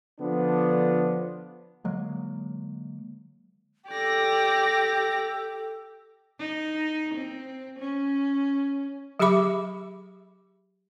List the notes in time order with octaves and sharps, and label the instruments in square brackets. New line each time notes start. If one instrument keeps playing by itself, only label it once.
[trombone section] D3 F3 B3 D4
[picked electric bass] D3 F#3 G#3 A#3
[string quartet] G4 [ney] A4 [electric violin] D5 A#6
[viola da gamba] D#4
C4
C#4
[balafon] F#3 G4 G#4 E5 B5 D6